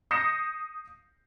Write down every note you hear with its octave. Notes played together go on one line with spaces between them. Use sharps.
D#6 G6 A#6 C7 C#7 E7